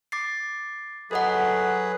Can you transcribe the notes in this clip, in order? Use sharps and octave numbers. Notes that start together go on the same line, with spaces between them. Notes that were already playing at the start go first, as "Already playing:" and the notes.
D6 A6 C7
F#3 G#4 A4 B4 D#5 F#5